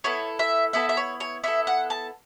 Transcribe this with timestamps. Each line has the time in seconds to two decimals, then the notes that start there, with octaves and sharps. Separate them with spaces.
0.04 B3 E4 A4 C#5
0.39 E5
0.73 B3 E4 A4 E5
0.89 E5
0.97 C#5
1.20 C#5
1.44 B3 E4 A4 E5
1.67 F#5
1.90 A5